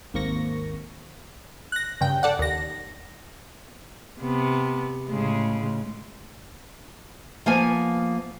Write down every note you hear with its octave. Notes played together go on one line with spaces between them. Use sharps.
G#1 D#2 A#3 C4 C#6 A#6
F#6 A#6
G2 C#3 G5
A4 D5 F#5
D#2 A#6
C3 B3
A2 C#3 G#3
F3 A#3 B3 G#5